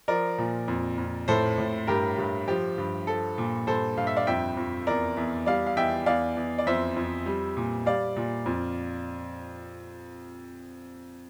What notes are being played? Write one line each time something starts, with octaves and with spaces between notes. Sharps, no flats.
F3 A#4 D5
A#2
F2
F2
A2 A4 C5
A2
G2 G4 A#4
G2
F3 G4
G2
F3 A4
A#2
G2 A4 C5
G2 F5
E5
D5 F5
F2 E5 G5
F2
E2 A#4 D5
E2
G3 D5 F5
F5
E2 E5 G5
E2 D5 F5
E2
D5
F2 C5 E5
F2
G3
A#2
G3 D5 F5
A#2
F2